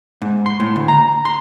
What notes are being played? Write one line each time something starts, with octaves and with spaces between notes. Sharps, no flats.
G#2
C6
A2
D2
A#5
C6